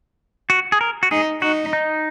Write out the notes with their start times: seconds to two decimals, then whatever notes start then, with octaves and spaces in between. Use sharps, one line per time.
0.50 F#4
0.72 G#4
0.81 A#4
1.03 F#4
1.11 D#4 G#4
1.42 D#4 F#4
1.73 D#4